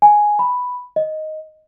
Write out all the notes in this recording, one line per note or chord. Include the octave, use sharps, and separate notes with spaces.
G#5
B5
D#5